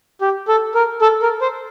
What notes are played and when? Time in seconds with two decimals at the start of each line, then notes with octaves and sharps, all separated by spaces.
0.21 G4
0.48 A4
0.75 A#4
1.02 A4
1.22 A#4
1.41 C5